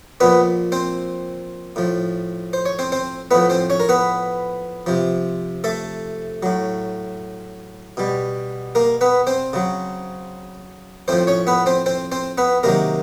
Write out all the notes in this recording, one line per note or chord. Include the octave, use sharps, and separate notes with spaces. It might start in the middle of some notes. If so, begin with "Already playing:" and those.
A#2 F3 B3 B4
C4 C5
A2 F3
C5
C#5
C4 C5
C4 C5
A2 F3 B3 B4
C4 C5
C#4 C#5
A#4
B3 B4
C3 F3
A3 A4
A2 F#3
B2 G3
A#3 A#4
B3 B4
C4 C5
C#3 F#3
A2 F3 C4 C5
C#4 C#5
B3 B4
C4 C5
C4 C5
C4 C5
B3 B4
C3 D#3 F#3 A#3 A#4